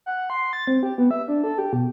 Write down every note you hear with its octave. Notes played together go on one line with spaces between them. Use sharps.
F#5
C6
A6
C4
G4
B3
E5
D4
A4
G4
B2